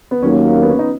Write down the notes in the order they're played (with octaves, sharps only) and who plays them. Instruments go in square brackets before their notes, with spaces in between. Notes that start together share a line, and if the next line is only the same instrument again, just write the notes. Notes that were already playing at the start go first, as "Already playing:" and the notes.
[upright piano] B3
[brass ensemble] D#2 D#3 F#3 A#3 [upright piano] C#4
[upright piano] C#4
B3
C#4
D#4